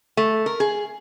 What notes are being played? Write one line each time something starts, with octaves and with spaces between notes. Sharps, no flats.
A3
A#4
G#4